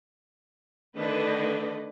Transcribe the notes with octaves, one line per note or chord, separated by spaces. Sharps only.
D3 D#3 A3 D4 B4 D#5